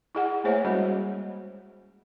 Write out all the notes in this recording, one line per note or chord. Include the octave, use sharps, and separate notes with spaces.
E4 G#4 F#5
A3 A#3 G#4 C5 C#5 E5
G3 G#3 C#4 F#4 D#5